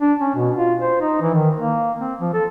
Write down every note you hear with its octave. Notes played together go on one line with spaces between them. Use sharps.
D4
C#4
B2
F4
C5
D#4
E3
D#3
A#3
C4
F3
A4